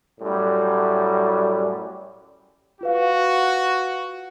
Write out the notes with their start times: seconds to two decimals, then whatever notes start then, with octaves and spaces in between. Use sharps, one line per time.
0.21 F#2 A2 G3
2.81 F4 F#4 B4 F5